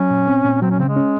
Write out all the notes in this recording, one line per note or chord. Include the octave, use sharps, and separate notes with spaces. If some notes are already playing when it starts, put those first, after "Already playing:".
Already playing: F#3 C#4
A#2
C4
A#2
F#3 C4
C#4
C#3 C4
G#3
C#4